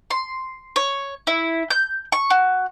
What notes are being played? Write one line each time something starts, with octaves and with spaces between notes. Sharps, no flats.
C6
C#5
E4
G6
C#6
F#4